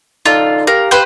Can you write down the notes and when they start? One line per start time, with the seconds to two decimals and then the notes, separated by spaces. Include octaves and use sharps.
0.26 D#4 F4 A4 D5
0.67 G4 A#4 F5
0.91 B4 C5 G5